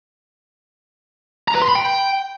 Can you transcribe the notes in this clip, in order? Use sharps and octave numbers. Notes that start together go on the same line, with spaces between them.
A#5
B4
C6
B5
G5